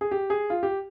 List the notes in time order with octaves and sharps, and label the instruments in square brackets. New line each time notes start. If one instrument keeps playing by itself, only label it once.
[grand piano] G#4
G4
G#4
F4
G4